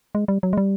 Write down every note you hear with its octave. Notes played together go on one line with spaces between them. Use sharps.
G#3
G3
F#3
G#3
G3